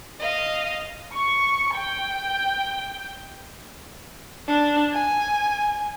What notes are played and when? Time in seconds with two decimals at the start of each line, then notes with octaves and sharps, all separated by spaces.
0.19 D#5 F5
1.14 C#6
1.76 G5
4.47 D4
4.93 G#5